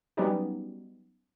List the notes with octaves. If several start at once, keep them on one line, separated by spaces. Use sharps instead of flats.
F#3 G3 B3 C#4 D#4 G4